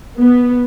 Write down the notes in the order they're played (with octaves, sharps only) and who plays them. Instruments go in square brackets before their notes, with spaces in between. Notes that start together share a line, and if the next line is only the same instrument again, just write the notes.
[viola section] B3